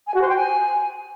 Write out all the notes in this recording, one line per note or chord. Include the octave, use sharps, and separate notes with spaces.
G#5
F#4
C5
G5
G#5